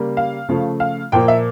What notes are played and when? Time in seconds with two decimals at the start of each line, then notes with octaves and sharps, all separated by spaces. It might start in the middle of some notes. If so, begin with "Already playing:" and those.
Already playing: C#3 G3 A#3
0.17 F5
0.49 C#3 F3 A3
0.80 F5
1.12 A#2 F3 A#3 G5
1.28 E5